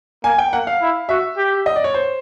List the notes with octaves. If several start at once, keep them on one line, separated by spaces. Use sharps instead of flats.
A#3 G#5
G5
A#3 F#5
F5
E4
F#4 E5
G4
D#5
D5
C#5
C5